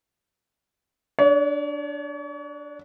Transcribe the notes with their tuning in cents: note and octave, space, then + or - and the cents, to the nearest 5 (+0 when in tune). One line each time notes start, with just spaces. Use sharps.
D4 +0 C#5 +40